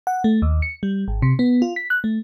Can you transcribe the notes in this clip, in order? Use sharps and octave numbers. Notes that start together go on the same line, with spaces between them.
F#5
A3
D#2
C#7
G3
G#1
C3
B3
F4
B6
F#6
A3